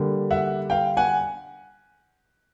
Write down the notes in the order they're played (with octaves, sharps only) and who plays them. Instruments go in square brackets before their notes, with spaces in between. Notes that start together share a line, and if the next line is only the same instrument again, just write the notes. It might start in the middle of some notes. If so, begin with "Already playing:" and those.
Already playing: [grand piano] D3 G3 A#3
E5 F#5
F5 G5
F#5 G#5